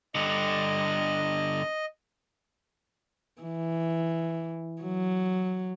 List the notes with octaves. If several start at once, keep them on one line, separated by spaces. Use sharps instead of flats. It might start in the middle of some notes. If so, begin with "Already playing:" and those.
G2 D3 D#5
E3
F#3